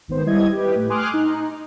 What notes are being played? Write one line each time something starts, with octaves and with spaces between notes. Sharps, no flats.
G#1 D#3 B3 C5
G3 E4 D#5 G#6
G4 B4
A2
G#5 C6 D6 D#6 F6 F#6
D#4